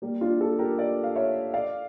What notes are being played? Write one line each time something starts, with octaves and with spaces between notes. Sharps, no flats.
G3 A#3
D4 F4
F4 A4
G4 A#4
A#4 D5
F5
C#5 E5
D5 F5